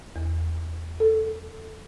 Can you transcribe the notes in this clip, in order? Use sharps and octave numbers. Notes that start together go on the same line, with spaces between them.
E2
A4